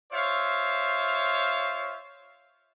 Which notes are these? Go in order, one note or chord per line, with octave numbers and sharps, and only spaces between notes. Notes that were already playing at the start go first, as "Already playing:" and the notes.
F4 C5 C#5 E5 F5